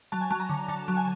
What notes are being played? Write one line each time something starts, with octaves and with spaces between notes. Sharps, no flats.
F#3 A5
G#5
F#3 A5
A#5
D3
D3 A5
F#3
G#5